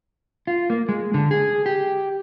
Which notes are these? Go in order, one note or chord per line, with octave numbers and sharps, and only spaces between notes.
F4
A#3
G#3
D3
G#4
G4